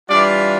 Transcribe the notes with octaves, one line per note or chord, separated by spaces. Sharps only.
E3 G3 D4 F4 D5